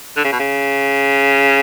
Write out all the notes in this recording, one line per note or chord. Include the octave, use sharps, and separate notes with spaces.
D3
C#3
B2
C#3